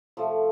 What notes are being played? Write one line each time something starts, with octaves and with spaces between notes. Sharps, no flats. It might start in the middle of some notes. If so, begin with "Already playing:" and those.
C3 F3 A3